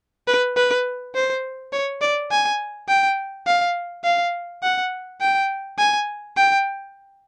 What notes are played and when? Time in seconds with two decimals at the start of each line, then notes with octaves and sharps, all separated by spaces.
0.28 B4
0.56 B4
1.15 C5
1.73 C#5
2.01 D5
2.31 G#5
2.88 G5
3.47 F5
4.04 F5
4.63 F#5
5.21 G5
5.78 G#5
6.37 G5